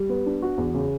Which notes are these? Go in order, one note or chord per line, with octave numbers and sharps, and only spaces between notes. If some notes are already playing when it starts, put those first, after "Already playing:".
Already playing: G3
B3
D4
F#4
E2
C#3